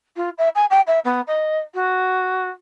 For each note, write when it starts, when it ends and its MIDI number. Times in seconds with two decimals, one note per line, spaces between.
0.16 0.30 65
0.38 0.49 76
0.55 0.65 80
0.70 0.81 79
0.87 0.99 76
1.05 1.21 59
1.27 1.57 75
1.74 2.49 66